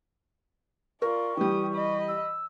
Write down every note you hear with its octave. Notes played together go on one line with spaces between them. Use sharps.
F4 A#4 D5 C#6
E3 G3 G4 D#6
D#5 B5
E6